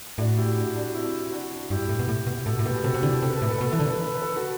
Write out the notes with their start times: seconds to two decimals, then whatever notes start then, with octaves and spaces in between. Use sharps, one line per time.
0.18 A2 D4 F#4
0.37 E4 G4
0.57 D4 F#4
0.75 D4 F#4
0.94 C4 E4
1.32 D4 F#4
1.70 G2 E4 G4
1.89 A2
1.99 B2
2.08 A2
2.27 B2
2.46 A2 F#4 A4
2.59 A2
2.65 B2 G4 B4
2.84 C3 F#4 A4
2.94 C3
3.03 D3 E4 G4
3.22 C3 A4
3.30 B4
3.37 A4
3.42 A2 B4
3.50 A4
3.58 B4
3.61 B2
3.65 A4
3.73 E3 B4
3.79 D3 A4
3.86 B4
3.93 A4
4.01 B4
4.08 A4
4.15 B4
4.22 A4
4.30 B4
4.36 F#4 A4